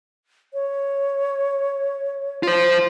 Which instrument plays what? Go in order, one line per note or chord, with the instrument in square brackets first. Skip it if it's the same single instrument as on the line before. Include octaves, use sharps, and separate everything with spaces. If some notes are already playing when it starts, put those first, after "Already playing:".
[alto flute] C#5
[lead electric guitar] F4 C5